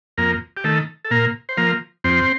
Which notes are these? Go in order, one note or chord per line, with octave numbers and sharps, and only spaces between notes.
F2 A#3 A#4
G4
D#3 A3 A4
A4
A#2 A#3 A#4
C5
F3 A#3 A#4
F2 C4 C5